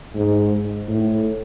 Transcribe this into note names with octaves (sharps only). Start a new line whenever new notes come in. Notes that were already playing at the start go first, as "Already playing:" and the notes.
G#2
A2